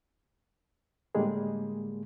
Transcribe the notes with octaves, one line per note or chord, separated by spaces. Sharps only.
A2 D3 G3 G#3 A#3 G#4